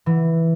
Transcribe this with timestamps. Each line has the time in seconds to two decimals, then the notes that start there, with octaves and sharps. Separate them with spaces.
0.06 E3